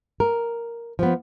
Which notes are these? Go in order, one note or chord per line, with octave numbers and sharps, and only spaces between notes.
A#4
F3 B3